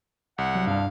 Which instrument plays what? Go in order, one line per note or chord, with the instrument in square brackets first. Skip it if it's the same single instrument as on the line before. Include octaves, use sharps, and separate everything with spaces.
[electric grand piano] C2 [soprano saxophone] F#5
[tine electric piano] F#3
[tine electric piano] G2 D4 [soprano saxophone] F5